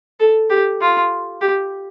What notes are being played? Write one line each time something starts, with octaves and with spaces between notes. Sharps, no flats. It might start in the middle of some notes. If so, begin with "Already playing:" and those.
A4
G4
F4
G4